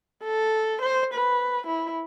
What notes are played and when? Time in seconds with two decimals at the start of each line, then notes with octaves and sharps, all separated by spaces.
0.24 A4
0.82 C5
1.14 B4
1.67 E4